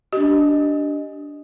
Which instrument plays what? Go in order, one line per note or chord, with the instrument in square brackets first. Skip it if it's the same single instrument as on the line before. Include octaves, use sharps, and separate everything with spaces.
[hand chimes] D4 D#5 [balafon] G4